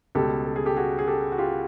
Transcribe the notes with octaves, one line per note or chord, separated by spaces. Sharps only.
C#2 B2 G3 G4 A4
A4
G#4
G4 A4
F#4 G#4
G#4
G4 A4
F#4
F4 G4